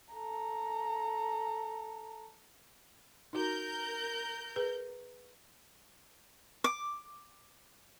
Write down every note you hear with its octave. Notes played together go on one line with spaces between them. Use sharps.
A4 A#5
D#4 F#4 A#4 G6
G#4 B4
D6